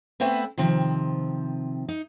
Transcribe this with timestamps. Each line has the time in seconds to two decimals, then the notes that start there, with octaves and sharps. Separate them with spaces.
0.20 A3 B3 C4 B4 C5 E5
0.58 C3 D#3 F3 C4
1.88 D#4